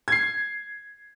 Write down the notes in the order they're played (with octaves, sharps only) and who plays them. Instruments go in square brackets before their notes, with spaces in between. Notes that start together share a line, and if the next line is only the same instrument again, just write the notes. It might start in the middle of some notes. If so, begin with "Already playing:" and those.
[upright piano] G#6 C7